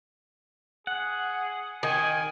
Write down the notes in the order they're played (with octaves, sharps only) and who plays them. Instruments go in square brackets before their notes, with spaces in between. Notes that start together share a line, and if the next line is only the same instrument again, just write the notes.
[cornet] G#4 [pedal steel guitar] F#5
[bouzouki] D#3 [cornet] G#5